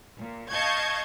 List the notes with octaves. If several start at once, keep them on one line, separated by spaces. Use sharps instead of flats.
A#2
D#5 F5 A5 C#6 G6 G#6